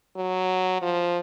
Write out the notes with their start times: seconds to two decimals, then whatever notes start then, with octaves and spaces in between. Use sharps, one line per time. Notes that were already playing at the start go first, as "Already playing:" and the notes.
0.16 F#3
0.82 F3